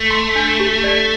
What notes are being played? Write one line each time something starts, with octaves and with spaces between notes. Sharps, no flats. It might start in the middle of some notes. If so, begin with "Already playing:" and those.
Already playing: A3
C6
D4
G4
D5